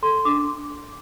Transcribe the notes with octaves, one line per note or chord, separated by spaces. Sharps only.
A4 C6
D4 D6